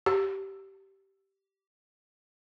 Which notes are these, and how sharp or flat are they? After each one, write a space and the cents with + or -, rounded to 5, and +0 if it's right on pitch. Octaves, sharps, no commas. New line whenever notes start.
G4 -15